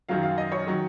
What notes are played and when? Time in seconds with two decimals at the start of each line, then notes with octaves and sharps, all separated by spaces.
0.09 F#2 D#3 F#3 F5
0.23 F5
0.38 D#5
0.52 C#5
0.67 D#3 F#3